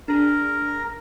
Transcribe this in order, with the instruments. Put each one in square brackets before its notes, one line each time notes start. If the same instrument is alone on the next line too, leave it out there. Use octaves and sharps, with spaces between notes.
[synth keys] D4 G#4 [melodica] A#4